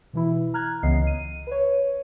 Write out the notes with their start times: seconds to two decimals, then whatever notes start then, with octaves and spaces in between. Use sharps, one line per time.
0.13 B2 E3 E4
0.54 A#5 F6 F#6 G#6
0.83 C#2 C#3 E3 B3 D#5 C7
1.07 D#7
1.47 B4 C#5